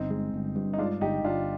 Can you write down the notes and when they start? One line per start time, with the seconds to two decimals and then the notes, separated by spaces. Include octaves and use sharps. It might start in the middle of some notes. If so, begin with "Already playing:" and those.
Already playing: G1 C4 D#4
0.11 G#3
0.34 G1
0.56 G2
0.73 D#4
0.78 G#3 D4 F4
1.01 G1 D#4 G4
1.24 G1 D4 F4